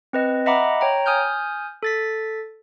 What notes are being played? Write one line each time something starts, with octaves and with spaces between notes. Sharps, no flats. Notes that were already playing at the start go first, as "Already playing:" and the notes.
C4 B4 D#5
D#5 E5 F#5 A#5 B5 D6
C#5 G5 A#5
G#5 D#6 F6 G6
A4 A6 B6